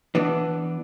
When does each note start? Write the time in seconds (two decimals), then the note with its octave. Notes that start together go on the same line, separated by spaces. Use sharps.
0.15 E3 B3 D4